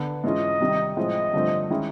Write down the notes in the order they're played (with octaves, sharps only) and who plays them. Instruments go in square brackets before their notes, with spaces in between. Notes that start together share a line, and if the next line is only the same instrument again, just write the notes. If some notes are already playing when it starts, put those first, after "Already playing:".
Already playing: [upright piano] D3 B3
[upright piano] G#2 E3 G#3 C#4 F4 [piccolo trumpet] D#5
[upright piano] C3 D#3 G3
[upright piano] A2 F3 G#3 C4 [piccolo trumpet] D#5
[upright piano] G2 D3 F3 A3 C4
D#3 G#3 C#4 E4